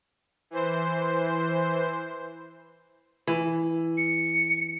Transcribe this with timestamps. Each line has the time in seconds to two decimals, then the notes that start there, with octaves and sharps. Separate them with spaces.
0.51 E3 C5
3.27 E3
3.98 C#7